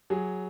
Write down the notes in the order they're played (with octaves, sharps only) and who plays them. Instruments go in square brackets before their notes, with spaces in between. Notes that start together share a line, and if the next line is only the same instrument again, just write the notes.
[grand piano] F#3 G#4